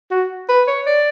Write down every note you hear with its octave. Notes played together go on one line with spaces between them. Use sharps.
F#4
B4
C#5
D5